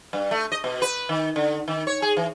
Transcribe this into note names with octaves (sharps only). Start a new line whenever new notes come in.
G2
A3
D#5
B2
B4
D#3
D3
D#3
C#5
G#4
E3